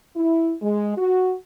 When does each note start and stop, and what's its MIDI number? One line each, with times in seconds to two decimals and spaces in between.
0.16 0.53 64
0.61 0.93 56
0.96 1.34 66